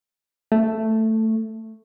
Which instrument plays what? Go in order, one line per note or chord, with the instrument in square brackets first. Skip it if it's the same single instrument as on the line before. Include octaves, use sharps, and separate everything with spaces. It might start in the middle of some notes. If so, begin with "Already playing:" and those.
[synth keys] A3